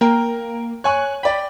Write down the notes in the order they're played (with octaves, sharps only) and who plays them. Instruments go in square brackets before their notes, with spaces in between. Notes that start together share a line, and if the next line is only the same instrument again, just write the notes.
[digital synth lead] A#3 [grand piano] A#4 G5 A#5
[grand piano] C#5 G#5 C#6 [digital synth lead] F#6
[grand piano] D5 G5 [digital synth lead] B5